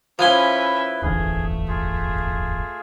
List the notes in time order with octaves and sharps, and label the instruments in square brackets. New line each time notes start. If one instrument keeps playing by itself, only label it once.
[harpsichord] F3 G#5 C6 [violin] C#4 E5 [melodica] E4 B4
[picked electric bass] D1 G1 E2 [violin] A3 [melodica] G#4
[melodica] F4 G#4